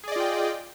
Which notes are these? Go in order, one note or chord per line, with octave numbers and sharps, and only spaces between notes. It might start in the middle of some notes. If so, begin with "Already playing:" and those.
F4 G#4 D5 D#5 G5